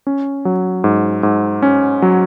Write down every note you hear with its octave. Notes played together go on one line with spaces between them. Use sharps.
C#4
F#3
G#2
G#2
C#4
F#3